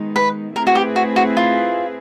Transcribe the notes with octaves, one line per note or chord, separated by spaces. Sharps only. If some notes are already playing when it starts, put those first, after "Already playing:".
Already playing: D#3 G#3 B3 D#4
B4
A3 C4 E4 G#4 A#4 B4
F#4
G4
F#4
F#4
F4